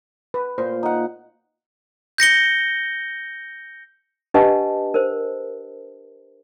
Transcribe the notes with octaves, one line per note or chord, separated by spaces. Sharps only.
B4
A#2 C5
D#4 F#5
G6 A#6 C#7 G7
D4 G4 B4 D#5 F#5 A5
A#4 C5